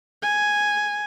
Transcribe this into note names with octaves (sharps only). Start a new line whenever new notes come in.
G#5